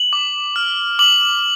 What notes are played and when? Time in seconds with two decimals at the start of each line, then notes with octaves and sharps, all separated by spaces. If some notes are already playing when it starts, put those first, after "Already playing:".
Already playing: F#7
0.13 D6
0.56 F6
0.99 D6 F#7